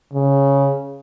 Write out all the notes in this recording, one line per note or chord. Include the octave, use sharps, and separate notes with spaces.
C#3